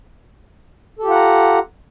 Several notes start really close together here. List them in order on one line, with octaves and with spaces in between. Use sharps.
A4 G4 F4 F#5 A#5